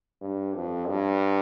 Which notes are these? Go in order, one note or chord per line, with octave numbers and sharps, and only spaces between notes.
G2
F2
G2